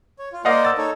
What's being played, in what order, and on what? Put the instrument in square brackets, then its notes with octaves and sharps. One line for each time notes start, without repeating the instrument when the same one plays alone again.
[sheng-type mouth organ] C#5
F4
[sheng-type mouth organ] A#3 C5 D5 [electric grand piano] D#5 F5 F#5
[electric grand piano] E6 A6
[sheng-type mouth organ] D#4 A4 C#5